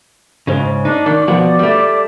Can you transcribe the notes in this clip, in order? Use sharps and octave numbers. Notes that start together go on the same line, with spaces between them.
G#2 C#3
D4 D#4
D#3 D5
B2 F3 F#5
G3 A3